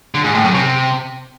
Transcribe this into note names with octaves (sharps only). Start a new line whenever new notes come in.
D3
G#2
A2
F#2
C3